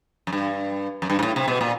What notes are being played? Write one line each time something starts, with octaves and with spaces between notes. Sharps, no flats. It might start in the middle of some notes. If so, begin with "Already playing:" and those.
F#2
G2
F#2
G2
G#2
A2
C3
B2
A#2